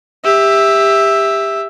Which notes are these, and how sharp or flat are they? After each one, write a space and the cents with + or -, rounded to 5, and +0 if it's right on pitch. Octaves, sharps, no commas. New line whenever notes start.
G4 +25 E5 +0